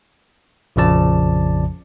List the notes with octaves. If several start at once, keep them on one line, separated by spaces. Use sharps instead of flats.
A#1 F2 C#3 F3 D5 A5